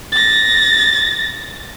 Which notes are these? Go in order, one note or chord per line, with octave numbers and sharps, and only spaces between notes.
A6 A#6